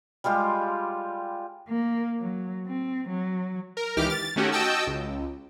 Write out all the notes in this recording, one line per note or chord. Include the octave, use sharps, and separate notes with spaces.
G3 G#3 F4 G4
A#3
F#3
C4
F#3
A#4
C#2 D#3 E3 G4 D6 F6
A6
D#3 A3 C#4 F#4 G4
F#4 D#5 G5 A5 E6
C#2